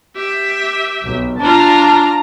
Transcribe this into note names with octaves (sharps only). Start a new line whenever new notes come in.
G4 E5
B1
D4 F4 A5 A#5